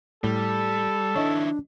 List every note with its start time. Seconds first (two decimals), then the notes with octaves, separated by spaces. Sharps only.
0.24 A2 G3 A4
1.15 D#3 D4 E4 C#5 D#5